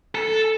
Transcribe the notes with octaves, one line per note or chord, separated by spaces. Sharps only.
A4